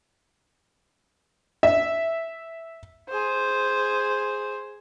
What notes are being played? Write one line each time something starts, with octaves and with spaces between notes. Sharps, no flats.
E5
G#4 C5